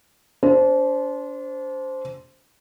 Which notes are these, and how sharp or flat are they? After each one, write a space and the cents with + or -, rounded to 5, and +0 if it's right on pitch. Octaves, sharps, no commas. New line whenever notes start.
D4 -35 C5 -5